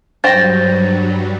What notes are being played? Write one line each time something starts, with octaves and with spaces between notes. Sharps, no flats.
G2 F#3 G3 G4 C5 G5 A6 A#6